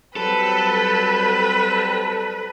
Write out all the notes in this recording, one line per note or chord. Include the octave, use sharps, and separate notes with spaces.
F#3 G3 C4 A4 B4